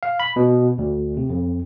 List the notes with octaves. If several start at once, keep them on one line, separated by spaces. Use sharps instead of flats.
F5
B5
B2
D2
C3
F2